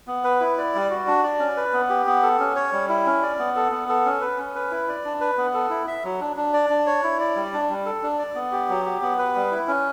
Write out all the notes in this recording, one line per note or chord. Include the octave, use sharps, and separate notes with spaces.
B3
B4
E4
D5
G3
F#4
D4
D5
C#4
B4
B3
G4
B3
A4
C#4
C#5
G3
E4
C#4
D5
B3
A4
B3
A4
C#4
B4
C#4
B4
E4
D5
D4
B4
B3
A4
E4
E5
F#3
D4
D4
D5
D4
C#5
E4
D5
G3
D4
G3
A4
D4
D5
B3
G4
F#3
G4
B3
B4
G3
E4
C#4